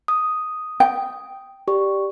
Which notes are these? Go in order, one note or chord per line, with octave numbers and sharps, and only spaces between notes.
D#6
G5
G4 D5 C#6